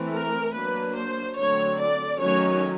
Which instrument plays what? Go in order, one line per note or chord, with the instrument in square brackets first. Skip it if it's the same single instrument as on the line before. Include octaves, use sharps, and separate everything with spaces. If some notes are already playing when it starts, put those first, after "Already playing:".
Already playing: [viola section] E3 A3 C4
A#4
F#3 A#3 D4 B4
C5
D3 F#3 A3 C4 C#5
D5
D#3 F#3 A3 C#4 C#5